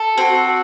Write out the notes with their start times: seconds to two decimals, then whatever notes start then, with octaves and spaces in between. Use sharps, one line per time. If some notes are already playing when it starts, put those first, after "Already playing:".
Already playing: A4
0.18 C4 F#4